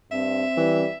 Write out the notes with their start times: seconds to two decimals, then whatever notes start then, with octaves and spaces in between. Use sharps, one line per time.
0.11 G2 C4 E5
0.57 E3 G3